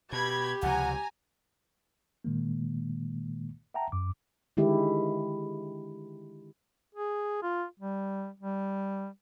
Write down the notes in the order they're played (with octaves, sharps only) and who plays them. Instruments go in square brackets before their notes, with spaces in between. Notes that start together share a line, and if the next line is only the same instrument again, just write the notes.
[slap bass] B2 [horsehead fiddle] G4 [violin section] B5 G#6
[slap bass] C#2 C3 F3 [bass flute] F#5 [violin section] G#5 A#5
[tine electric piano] A#2 D#3 G#3 A#3
E5 F#5 G5 A5 A#5
F#2 D6
[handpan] D3 D#3 G#3 E4 G4
[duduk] G#4
F4
G3
G3